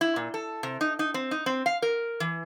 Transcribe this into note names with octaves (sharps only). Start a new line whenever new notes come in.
E4
A#2
A4
C3
D#4
D#4
C4
D#4
C4
F5
A#4
E3